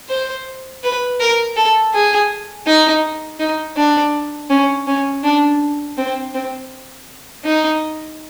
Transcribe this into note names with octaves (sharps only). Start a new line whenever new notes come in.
C5
B4
A#4
A4
G#4
D#4
D#4
D4
C#4
C#4
D4
C4
C4
D#4